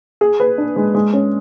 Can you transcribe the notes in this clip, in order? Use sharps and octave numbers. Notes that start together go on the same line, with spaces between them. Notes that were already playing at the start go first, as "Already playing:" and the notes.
G#4
B4
D4
G#3
G#3
C#4